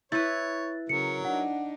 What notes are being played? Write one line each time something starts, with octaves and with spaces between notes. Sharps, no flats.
E4 B4 C#5 A6
C#3 F#3 A#4 C#7
D4 D#4 F#5